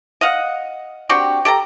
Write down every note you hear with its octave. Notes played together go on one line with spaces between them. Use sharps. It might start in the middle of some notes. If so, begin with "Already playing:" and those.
D#5 F5 F#5
C4 D4 F#4 G4
G4 A4 A5 A#5